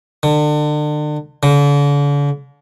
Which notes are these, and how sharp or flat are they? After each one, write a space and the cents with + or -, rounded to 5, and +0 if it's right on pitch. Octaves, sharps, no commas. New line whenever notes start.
D3 +35
D3 -40